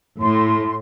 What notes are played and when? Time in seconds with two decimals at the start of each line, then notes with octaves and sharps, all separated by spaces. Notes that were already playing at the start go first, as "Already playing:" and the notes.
0.21 A2 C6